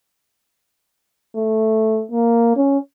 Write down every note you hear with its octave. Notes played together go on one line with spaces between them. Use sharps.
A3
A#3
C#4